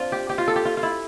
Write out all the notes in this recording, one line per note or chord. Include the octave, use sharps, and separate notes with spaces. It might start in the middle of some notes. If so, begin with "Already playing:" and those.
Already playing: C4 D4 F4
G4
G4
F4
A4
G4
F4
F4
E4